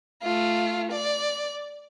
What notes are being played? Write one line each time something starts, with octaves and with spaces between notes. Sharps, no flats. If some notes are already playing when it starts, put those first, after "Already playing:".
A3 F4
D5